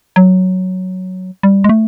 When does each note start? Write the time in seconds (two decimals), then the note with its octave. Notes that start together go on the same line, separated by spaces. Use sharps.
0.16 F#3
1.43 G3
1.64 G#3
1.69 A3